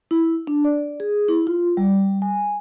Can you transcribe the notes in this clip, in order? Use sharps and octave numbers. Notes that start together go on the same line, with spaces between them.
E4
D4
D5
G#4
E4
F4
G3
G#5